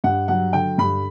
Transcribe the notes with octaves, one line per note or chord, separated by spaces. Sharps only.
G2 F#5
F#3 F#5
D3 G5
G2 B5